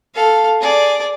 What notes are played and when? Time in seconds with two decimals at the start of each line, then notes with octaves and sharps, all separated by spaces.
0.15 A4 F5
0.61 G#4 D5